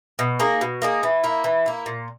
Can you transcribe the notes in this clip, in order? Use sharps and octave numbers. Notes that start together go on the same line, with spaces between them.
B2
A#3 D#4 G#4
B2
A#3 D#4 G#4
E3
A#3 E4
E3
A#3 E4
A#2